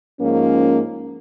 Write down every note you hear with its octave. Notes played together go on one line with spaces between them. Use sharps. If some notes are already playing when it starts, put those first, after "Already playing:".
G#2 F3 A#3 C#4